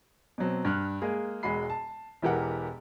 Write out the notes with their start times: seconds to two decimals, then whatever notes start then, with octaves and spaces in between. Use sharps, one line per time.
0.38 B2 F#3 C4
0.65 G2 F6 F#6
1.02 G#3 A#3 G#4
1.43 E1 G#3 F#4 B5 C7
1.70 A5
2.22 E1 E3 G4 A#4 F#5